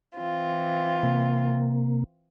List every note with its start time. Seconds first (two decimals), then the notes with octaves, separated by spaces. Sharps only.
0.17 E3 C4 F4
1.03 C3 A#3